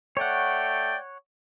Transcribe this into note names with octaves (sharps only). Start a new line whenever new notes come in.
A3 C#5 D5 F#5 G5